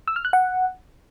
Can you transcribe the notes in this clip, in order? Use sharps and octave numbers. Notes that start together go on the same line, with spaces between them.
E6
F6
F#6
F#5